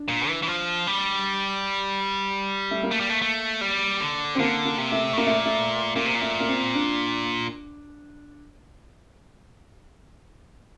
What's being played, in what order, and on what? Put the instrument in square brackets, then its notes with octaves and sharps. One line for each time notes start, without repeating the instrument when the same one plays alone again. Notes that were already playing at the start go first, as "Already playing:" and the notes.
Already playing: [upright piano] D4
[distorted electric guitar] A#2
E3
E3
F3
G3
[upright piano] A3
A#3
[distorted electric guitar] A3
G3
A3
A3
G3
D3
[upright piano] C4
[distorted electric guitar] D3 [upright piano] A#3
[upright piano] A#3
[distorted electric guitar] C3
[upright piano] A3
[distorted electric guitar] A2
[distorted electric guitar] A#2 [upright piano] A#3
[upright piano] A3
A3
[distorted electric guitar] A#2 [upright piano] A#3
[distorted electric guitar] C3
A#2
[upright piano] A3
A#3
C4
D4